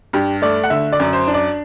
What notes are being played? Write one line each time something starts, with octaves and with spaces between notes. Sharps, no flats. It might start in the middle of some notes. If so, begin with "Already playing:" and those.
G2 G4
A3 D5
F#5
D3 E5
D5
F#2
C5
D4
D5